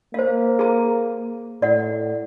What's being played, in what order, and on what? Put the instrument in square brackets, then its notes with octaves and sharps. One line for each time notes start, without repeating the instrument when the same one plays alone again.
[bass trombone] A#3 [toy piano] C5 F5
[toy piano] G#4 A#5
[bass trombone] A2 [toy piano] D5 F#5